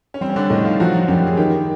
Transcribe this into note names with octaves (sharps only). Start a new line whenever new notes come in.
C#4
G3 C4
C#4
D3 D4
A2 D#3 D#4
F3 F4
F3 F#3 F#4
F#2 G3 G4
G#4
D#3 G3 G4